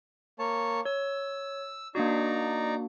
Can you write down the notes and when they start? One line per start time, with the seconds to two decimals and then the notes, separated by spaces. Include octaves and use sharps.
0.39 A#3 C#5 A5
0.85 C#5 E6
1.95 A#3 D4 D#4 F#4 D5 A#5